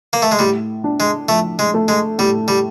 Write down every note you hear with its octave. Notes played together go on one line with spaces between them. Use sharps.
A#3
A3
G#3
A2 G3
D4
G#3
F3 A3
G#3
A3
G#3
A2 G3
G3